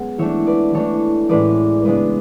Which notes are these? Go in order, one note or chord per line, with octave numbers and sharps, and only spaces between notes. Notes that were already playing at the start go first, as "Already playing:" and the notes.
Already playing: G#3 B3 C#4 G#4 F#5 G#5
E3 A3 D4 C#5 E5
B4 D5
E3 A3 D4 A4 C#5
A2 E3 G#3 C#4 B4 D5
C#3 G#3 B3 D4 B4 D5